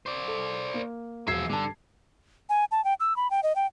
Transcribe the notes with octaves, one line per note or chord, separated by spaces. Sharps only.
C5 D5
A4
A#3
E1 F3 E5 G#6 C7
G2 D3 A5
G#5
A5
G5
E6
B5
G5
D#5
G5